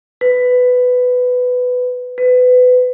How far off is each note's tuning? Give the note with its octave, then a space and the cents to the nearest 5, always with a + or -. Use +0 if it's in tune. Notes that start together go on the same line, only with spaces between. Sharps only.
B4 +10
B4 +25